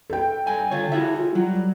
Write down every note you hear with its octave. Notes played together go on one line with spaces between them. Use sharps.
A4 G5
G2 G#5
D3 F4 C#5
E4 F#4 G#4 E5
F4
F#3 G3